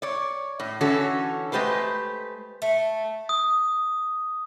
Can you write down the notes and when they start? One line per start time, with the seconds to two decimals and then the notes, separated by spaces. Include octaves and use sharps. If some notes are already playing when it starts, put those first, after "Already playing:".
0.02 C#5 D5
0.60 A2
0.81 D3 E3 C#4 F#4 A4
1.52 G#3 A3 G4 B4 C5
2.62 A3
3.29 D#6